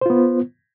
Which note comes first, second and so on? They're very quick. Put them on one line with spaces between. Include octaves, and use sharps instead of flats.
C5 F4 B3